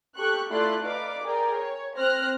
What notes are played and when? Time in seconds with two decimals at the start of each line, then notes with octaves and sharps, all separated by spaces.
0.17 G4 A4 C#6 F#6
0.50 A3 E4 F4 D5 C6 F#6
0.82 D#4 B4 D5 F5 D6
1.24 G#4 A#4 D5 G5
1.56 C#5
1.97 C4 C5 F6 F#6 A#6